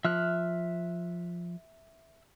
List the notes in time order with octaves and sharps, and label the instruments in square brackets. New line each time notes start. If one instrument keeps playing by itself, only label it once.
[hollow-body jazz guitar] F3 [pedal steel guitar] E5 F6 F#6